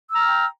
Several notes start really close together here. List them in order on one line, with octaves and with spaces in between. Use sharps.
E6 A#5 F6 G5